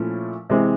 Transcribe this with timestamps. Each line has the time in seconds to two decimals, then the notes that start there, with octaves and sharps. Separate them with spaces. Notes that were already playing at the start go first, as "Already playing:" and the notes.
Already playing: A#2 F3 A3 C#4 E4
0.50 C3 E3 G#3 C4